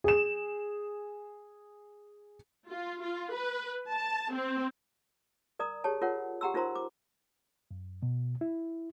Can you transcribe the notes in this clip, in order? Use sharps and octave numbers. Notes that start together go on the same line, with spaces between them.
G#4 E7
F4
F4
B4
A5
C4
A#4 D5 A#5 D#6
G4 G#4 C#5 A5
F4 A#4 C#5 F#5
G4 F#5 G5 A#5 C6 E6
D#4 F4 A#4 C5 A#5 C6
D6
F#2
B2
E4